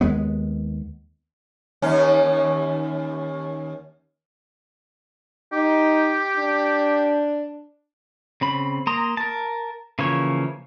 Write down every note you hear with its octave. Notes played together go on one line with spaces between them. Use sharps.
D#2 G#3 B3
D#2 C#4
D#4 G4
D4
C#3 C4 B5
A#3 A#5 C6 D#6
A#4 A5
C#3 E3 F3 A#3 C#5